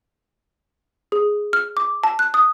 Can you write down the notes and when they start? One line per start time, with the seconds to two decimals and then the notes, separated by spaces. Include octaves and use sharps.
1.12 G#4
1.53 F6
1.77 D6
2.04 A5
2.19 F#6
2.34 D#6